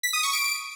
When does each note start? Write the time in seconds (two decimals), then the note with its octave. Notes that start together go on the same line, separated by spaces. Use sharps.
0.03 B6
0.13 D#6
0.23 C#6
0.33 D7